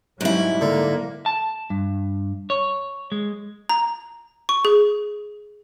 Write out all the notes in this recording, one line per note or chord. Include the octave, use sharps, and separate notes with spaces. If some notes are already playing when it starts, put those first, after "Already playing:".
G#2 F#3 G3 C#4 E4
D3 A#3
A5
G2
C#5
G#3
A#5
C#6
G#4